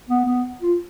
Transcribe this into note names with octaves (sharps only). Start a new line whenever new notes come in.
B3
B3
F4